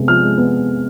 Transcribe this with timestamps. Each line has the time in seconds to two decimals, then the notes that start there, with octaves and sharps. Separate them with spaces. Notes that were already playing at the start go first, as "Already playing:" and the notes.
Already playing: C3 G#3 B3
0.08 F3 F6
0.23 G#3
0.38 B3